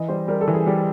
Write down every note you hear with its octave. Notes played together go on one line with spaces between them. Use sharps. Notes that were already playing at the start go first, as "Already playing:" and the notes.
Already playing: E3 D#5
G3 C5
G3 A#4
A4
E3
G#4
G3 G4